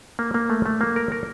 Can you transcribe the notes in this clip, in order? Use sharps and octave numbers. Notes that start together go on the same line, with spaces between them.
A#3
A#3
A3
A3
A#3
A#4
A#4